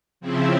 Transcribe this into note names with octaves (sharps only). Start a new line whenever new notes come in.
C#3 F3 C4 E4